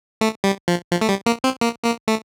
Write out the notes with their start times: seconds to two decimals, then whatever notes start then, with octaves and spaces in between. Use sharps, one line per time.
0.21 A3
0.44 G3
0.68 F3
0.91 F3
1.01 A3
1.09 G3
1.26 A#3
1.44 C4
1.61 A#3
1.84 A#3
2.08 A3